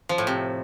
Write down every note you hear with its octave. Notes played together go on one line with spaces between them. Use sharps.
F3
A2
C3